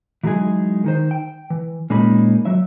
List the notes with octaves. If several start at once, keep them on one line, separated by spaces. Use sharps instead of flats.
E3 F#3 G#3 D#4 G#4
D#3 D#4 C5
G5
E3
A#2 G#3 A#3 C#4 D#4 B5
F#3 E5